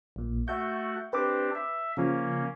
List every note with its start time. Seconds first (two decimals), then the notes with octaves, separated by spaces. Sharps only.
0.16 A#1 A#2
0.48 A3 F#4 E5 F#5 G6
1.13 C4 D4 G4 B4 D6
1.55 E5
1.97 C#3 F3 A#3 C#4